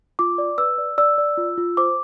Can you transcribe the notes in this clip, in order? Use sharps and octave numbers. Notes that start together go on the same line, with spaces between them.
F4 D6
D5
B4 E6
D5
D5 E6
D5
F4
F4
C5 D6